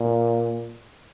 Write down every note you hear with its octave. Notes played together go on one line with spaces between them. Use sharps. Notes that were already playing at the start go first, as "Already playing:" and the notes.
Already playing: A#2